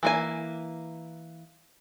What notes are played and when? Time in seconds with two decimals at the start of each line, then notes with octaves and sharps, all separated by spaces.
0.03 E3 A#3 G#5